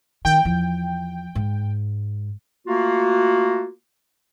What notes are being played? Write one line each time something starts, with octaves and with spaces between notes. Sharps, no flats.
D#3 G5
E2 F3
G#2
A3 A#3 F4 F#4